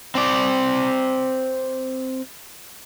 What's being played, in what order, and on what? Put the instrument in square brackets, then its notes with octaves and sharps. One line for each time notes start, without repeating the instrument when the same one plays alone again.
[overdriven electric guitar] C4 D5